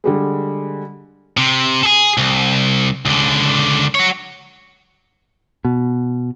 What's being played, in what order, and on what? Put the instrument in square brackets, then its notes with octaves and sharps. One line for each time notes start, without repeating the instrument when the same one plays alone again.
[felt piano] D3 G3 G#3
[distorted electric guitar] C3
G#4 A4
C2
C#2 D3
F#4 C#5
[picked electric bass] B2